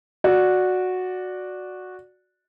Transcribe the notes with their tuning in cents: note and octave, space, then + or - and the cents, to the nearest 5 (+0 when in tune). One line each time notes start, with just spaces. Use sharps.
F#4 -10 D5 +0